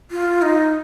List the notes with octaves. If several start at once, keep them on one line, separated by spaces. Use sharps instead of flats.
F4
D#4